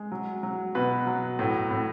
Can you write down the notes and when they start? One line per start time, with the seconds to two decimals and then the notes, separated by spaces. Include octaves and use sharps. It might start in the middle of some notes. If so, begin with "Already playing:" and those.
Already playing: G#3
0.12 F#3
0.43 F#3
0.75 B2 B4
1.07 F#3
1.39 A2
1.71 A2